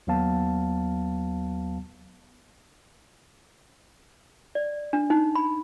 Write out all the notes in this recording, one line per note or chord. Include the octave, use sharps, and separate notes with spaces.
D#2 F#3 B3 F5 A5
D5
D4
D#4
B5